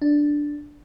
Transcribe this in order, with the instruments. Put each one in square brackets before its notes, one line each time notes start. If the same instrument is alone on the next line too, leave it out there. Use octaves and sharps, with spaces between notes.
[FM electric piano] D4